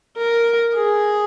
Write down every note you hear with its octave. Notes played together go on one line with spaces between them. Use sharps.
A#4
G#4